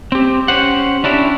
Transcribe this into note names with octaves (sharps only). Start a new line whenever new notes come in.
C4 G4
C#4 G4 C5 F#5
C#4 D4 E4 G4